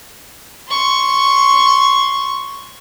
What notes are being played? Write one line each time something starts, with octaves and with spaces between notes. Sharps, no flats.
C6 C#6